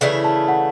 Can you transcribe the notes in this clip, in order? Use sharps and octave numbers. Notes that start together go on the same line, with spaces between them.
C#3 E3 A3 E4 D5
A5
F#5